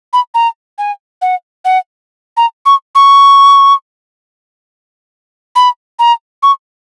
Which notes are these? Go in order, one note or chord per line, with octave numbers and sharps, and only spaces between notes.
B5
A#5
G#5
F#5
F#5
A#5
C#6
C#6
B5
A#5
C#6